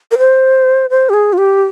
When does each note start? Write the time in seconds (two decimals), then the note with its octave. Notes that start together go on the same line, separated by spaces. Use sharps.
0.11 A#4
0.18 C5
0.90 C5
1.09 G4
1.14 G#4
1.33 F4
1.38 G4